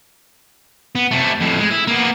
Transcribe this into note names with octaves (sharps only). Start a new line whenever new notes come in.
B3
C3 A3
F2 A2
G#3
E4
A#3 B3